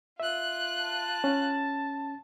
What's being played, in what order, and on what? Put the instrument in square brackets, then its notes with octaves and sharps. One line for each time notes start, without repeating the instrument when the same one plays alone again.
[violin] F4 F#6 [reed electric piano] E5
[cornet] A5
[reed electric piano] C#4